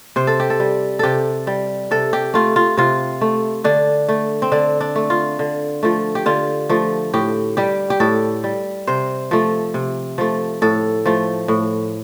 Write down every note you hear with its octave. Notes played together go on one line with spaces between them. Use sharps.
C3 C5
A4
G4
A4
G3
C3 G4 A4
G3
C3 A4
G4
A3 F4
F4
C3 F4
A3
D3 D4
A3
C4
D3 D4
D4
A3
F4
D3
F3 A3
G4
D3 F4
F3 A3
A2 G4
G3 G4
G4
A2 A4
G3
C3 C5
F3 A3
C3
F3 A3
A2 A4
F3 A3
A2